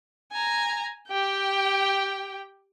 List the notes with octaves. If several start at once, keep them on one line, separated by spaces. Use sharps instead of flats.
G#5 A#5
G4 G5